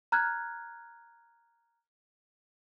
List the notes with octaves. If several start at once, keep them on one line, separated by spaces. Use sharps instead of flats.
A#5 F6 F#6 G#6